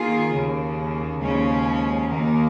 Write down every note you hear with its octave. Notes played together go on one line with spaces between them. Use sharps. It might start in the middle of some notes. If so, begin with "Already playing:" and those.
Already playing: D#3 A#3 F4 G#4
D#2 C#3 A#3
D#2 C#3 F3 G#3 C#4
D#2 D#3 A#3